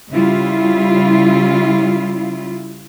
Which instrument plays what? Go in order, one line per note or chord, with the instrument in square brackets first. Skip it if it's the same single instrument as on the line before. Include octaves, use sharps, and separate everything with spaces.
[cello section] C#3 G3 E4 F4